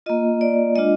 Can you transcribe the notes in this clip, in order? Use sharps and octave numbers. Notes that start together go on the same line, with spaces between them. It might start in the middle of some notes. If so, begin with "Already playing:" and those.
A#3 F4 D#5
D5
G#3 D4 F4 D#5